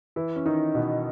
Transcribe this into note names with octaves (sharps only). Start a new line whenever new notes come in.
E3 E4
C#4
D#3 D#4
B2 B3